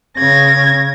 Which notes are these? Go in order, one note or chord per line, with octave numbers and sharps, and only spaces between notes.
C#3 G#6 A#6